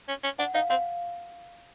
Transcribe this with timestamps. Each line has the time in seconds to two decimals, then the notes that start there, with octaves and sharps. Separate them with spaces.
0.08 C#4
0.23 C#4
0.39 D4 F#5
0.55 D#4 F5
0.70 C4 F5